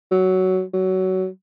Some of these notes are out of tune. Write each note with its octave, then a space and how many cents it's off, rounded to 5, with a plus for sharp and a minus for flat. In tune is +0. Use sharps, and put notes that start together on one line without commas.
F#3 +10
F#3 +20